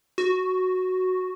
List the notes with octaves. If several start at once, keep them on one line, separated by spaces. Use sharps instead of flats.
F#4